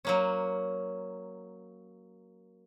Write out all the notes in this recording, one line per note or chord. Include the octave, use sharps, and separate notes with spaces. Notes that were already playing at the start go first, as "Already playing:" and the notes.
F#3 A#3 C#4